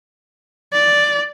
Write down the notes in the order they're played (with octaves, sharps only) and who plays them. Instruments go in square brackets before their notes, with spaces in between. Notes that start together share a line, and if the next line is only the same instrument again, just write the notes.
[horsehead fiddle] D5